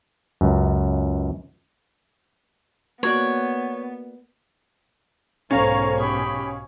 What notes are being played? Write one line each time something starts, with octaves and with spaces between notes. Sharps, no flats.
C#2 F#2
A#3 B3 F#4 C#5 D5
B1 G#2 B2 C#4 A4 C5 F5 A#5
G4 G#5 B5 D#6